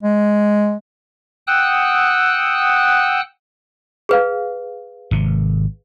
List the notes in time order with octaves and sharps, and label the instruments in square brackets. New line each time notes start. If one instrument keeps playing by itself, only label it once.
[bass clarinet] G#3
[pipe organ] F#5 G5 D#6 E6 F#6
[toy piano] G#4 B4 F5
[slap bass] G#1 C3